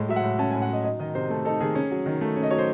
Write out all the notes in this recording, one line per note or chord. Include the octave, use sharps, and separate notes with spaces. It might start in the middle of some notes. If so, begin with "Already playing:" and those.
Already playing: A2 G#3
F#3 E5
F#5
A2
C#4 A5
G#5
A2
F#5
F#3 D#5
D#4 D#5
D#3 D#5
C3 C5
A3 A4
D#4 A4
D#3 G#4
C#4
F#3
D#3
A3
C#4
D#5
F#3 C#5
C5